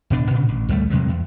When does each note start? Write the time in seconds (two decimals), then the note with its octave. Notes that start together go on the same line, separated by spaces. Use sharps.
0.10 D1 B2 D4
0.31 A#2 C#3
0.49 A1
0.69 D2 G3 A3
0.90 E2 C3 F#3 G#3
1.08 E2